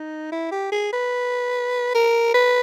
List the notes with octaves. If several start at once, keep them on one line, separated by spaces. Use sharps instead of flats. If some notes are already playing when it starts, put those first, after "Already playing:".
Already playing: D#4
E4
G4
G#4
B4
A#4
B4